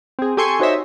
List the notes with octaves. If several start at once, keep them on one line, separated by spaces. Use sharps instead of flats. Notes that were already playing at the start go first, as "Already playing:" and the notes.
C4 G#4
G4 A4 G#5 C6 C#6
D#4 F#4 C5 C#5 D#5 E5